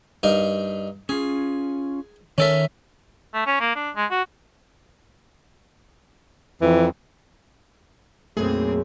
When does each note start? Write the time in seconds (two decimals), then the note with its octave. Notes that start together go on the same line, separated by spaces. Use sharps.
0.23 G2 D#4 A#4
1.09 C#4 F4 G#4
2.38 D#3 C#4 A4 A#4 D5 E5
3.34 A3
3.46 C#4
3.60 A#3
3.76 D4
3.96 G#3
4.11 F#4
6.62 F2 E3
8.37 B1 F#2 A3 A#3 C4 G#4